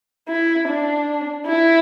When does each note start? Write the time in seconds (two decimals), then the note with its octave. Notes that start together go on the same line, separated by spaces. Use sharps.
0.29 E4
0.68 D4
1.47 E4